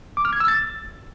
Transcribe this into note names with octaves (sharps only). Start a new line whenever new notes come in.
D6
F6
G#6
E6
A6